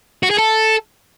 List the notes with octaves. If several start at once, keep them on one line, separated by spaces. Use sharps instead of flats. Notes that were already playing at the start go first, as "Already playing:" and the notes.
F#4
G#4
A4